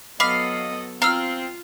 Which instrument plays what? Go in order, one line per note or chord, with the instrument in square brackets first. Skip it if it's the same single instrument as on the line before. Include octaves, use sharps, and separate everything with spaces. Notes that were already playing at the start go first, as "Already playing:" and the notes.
[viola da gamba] F#3 B3 A4 [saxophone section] D#5 [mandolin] F5 [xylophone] B5 D6 B6
[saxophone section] C4 [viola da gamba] F4 [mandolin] F5 [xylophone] A#5 E6 F6